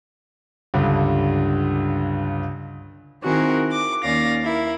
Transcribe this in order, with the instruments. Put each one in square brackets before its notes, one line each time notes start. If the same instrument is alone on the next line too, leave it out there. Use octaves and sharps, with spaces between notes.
[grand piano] C#2 G2 D3
[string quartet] D#3 C4 E4 F#4 G#4 A#4
D6
D#2 C#4 D5 F5 A#6
E4 A#4